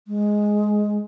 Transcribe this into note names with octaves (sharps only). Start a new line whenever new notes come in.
G#3